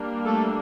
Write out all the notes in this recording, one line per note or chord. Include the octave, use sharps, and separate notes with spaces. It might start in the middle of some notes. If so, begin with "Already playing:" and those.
Already playing: G3 A#3 D4
A3 A4